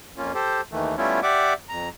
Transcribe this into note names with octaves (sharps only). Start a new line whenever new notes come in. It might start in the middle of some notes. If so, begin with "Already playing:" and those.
F2 A#3 C#4 F4
G4 A4 C5
D#2 D#3 E3 A3
G3 A3 B3 C#4 E4 F4
G4 D5 E5 F#5 D6
F2 A#5